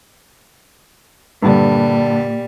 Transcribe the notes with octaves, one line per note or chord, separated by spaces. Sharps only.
G2 A#2 D3 G3